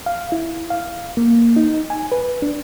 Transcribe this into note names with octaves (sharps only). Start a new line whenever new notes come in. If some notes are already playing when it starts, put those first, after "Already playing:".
F5
E4
F5
A#3
D#4
G#5
B4
D4